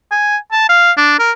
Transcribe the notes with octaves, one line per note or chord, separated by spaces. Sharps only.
G#5
A5
F5
D4
A#4